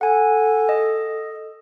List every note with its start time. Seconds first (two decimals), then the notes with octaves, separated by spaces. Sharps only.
0.01 A4 F#5 G#5
0.69 D#5